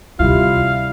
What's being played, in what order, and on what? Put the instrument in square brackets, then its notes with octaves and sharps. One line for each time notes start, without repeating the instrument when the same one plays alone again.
[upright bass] D2 [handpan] C3 G3 E4 [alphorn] F4 [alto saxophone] F5